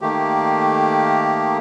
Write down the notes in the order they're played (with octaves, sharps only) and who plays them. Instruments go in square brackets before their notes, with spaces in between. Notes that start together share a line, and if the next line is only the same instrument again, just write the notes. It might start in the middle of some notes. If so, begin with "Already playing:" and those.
[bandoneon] D#3 A3 A#3 G4